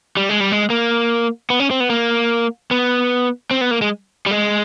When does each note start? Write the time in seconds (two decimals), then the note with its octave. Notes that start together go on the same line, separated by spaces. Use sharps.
0.17 G3
0.29 G#3
0.40 G3
0.51 G#3
0.70 A#3
1.50 B3
1.60 C#4
1.71 C4
1.80 B3
1.90 A#3
2.71 B3
3.51 C4
3.61 B3
3.71 A#3
3.82 G#3
4.26 G3
4.31 G#3